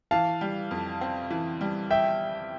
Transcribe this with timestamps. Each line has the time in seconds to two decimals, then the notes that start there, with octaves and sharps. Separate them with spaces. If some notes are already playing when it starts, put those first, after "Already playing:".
0.11 E3 F5 A5
0.41 G3
0.71 F2
1.01 C4
1.31 E3
1.61 G3
1.90 E5 G5